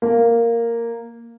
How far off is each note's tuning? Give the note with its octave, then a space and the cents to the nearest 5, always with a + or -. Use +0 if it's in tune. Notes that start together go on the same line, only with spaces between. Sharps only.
A#3 -5